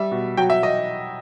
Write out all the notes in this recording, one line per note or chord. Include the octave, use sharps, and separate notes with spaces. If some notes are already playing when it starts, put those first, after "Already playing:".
Already playing: G3 E5
B2
F#3 G5
E5
D#5